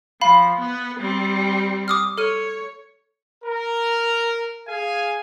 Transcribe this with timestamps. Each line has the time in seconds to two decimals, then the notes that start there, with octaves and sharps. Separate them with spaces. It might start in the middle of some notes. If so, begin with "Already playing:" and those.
0.21 F3 F5 B5
0.59 B3 B4
0.99 G3 C4
1.88 D6 D#6 F6
2.18 A4 C#5 F6 D#7
3.44 A#4
4.68 G#4 F5 G#5